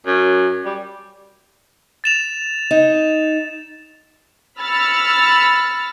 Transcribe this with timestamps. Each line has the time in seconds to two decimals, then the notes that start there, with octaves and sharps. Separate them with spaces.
0.07 F#2
0.65 G3
2.04 A6 E7 F7
2.71 D#4
4.59 B5 E6 F6 A6 C#7